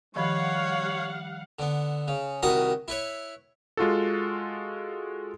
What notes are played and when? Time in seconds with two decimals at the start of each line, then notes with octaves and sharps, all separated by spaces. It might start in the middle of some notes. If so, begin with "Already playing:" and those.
0.16 D#3 F3 G3 C#5 F5 F#5 B5
1.59 D3 B3
2.08 C#3
2.43 C2 D#3 F#4 B4 A#5 D#6
2.88 E4 B4 C#5
3.77 G#3 F4 F#4 A4